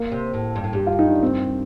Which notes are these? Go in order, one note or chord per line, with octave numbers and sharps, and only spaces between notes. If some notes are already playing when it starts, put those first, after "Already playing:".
Already playing: A#3
C3
A2
G2
A2
G2 G4
F4
D#4
D4
C4